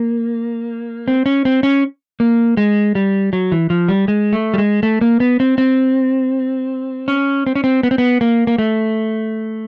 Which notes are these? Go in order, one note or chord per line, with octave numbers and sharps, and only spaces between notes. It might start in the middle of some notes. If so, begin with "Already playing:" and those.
Already playing: A#3
C4
C#4
C4
C#4
A#3
G#3
G3
F#3
E3
F3
G3
G#3
A3
G3
G#3
A3
A#3
B3
C4
C4
C#4
C4
C#4
C4
B3
C4
B3
A#3
A#3
A3